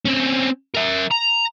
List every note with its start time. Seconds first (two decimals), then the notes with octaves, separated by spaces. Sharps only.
0.05 C4 C#4
0.74 A#4 E5
1.11 A#5